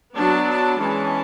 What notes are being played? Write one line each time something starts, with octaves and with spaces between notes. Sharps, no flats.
F#3 B3 D4 A5
A5
E3 G#3 C#4 A5